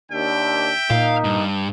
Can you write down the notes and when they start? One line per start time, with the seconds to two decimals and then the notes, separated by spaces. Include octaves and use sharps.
0.12 D#2 D4 E5 G5
0.91 A#2 A#3 D#4 F5
1.24 G2